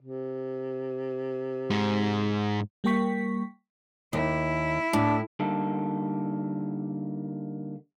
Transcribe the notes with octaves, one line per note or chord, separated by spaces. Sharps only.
C3
G#2
G3 A#3 A#4 G5 C#6 B6
D#2 E4
A2 D4
D3 G3 A#3 D#4 A4